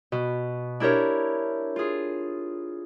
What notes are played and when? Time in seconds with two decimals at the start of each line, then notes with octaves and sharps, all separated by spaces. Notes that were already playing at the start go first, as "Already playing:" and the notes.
0.12 B2
0.80 D4 E4 G4 A#4 C#5
1.76 F4 G#4